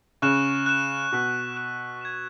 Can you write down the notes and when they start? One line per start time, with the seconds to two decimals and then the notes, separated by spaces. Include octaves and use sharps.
0.22 C#3 C#6 F#6 E7
0.66 F#6 E7
1.12 B2 C#6 E6 B6
1.57 F#6 E7
2.01 G#6 E7